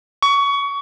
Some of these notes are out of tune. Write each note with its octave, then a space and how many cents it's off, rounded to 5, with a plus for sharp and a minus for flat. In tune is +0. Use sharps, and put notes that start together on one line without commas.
C#6 +25